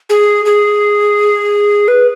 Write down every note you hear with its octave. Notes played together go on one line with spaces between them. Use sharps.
G#4
G#4
B4